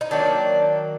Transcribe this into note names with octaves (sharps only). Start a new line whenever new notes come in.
D#4
D#3 F#3 A#3 D4